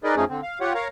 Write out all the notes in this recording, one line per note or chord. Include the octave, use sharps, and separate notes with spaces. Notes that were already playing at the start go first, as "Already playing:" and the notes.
D#4 G#4 A#4 B4 D5 D#5
F2 F3 A3 C#4 D#4 G#4
D3 C4
F5
F4 G4 C#5 F#5
A#4 C#5 F5 A#5